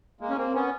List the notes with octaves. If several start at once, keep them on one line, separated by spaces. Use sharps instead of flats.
G#3 A#3
C#4
A#3 C4
B3 C#4